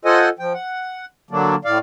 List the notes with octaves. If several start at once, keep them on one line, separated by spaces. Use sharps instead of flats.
F4 A4 C5 D#5 F#5 G#5
F3 G5
F#5
D3 F#3 A#3 D4
A2 D5 F5